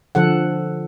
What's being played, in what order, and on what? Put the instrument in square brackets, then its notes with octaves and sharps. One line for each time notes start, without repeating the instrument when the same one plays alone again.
[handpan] D3 F3 A4 F#5